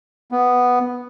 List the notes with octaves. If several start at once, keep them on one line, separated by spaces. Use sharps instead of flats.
B3